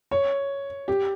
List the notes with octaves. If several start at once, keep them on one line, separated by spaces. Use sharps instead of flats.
C#5
G4